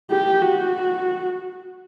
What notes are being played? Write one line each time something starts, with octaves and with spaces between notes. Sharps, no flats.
G4
F#4